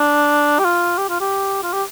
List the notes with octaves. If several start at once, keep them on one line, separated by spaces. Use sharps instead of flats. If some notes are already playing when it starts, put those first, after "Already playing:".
Already playing: D4
G4
F4
G4
F4
G4
F4
G4